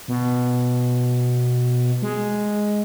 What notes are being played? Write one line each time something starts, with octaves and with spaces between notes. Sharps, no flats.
B2
G#3